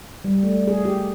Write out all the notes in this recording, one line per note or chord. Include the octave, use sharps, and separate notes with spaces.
G3
A3
G#4
G4